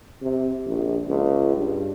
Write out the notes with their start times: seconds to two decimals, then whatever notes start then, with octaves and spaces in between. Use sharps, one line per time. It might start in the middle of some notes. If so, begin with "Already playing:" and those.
0.22 C3
0.66 A#1
1.07 C#2
1.56 G2